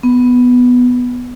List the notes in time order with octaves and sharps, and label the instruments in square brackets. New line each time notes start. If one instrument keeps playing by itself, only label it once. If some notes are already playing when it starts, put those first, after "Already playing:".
[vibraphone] B3